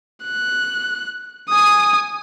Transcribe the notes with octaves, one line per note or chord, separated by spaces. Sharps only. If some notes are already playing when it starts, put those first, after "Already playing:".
F#6
G#5 D#6